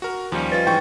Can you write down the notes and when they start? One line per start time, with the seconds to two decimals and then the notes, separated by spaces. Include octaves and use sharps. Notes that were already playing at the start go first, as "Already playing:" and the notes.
0.02 F#4 A#4
0.32 D#2 F3 G3 C#4
0.52 F4 B4 C#5 D#5 A6
0.67 G#2 E3 G5 C#6